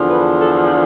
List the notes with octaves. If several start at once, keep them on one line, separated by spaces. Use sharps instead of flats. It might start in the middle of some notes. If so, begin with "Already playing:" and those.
Already playing: E2 D3 F3
B4
A4